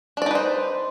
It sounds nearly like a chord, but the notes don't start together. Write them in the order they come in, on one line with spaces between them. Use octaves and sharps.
D4 D5 D#4 B4 C5